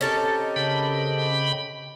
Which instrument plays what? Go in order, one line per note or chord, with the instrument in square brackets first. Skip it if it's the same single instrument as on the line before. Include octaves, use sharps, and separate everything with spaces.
[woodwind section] C4 G4 D#5 [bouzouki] C#4 A4 A#4
[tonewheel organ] C#3 G5 B5